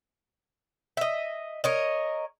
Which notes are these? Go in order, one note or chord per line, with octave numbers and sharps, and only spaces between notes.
D#5 E5
A#4 C#5 D#5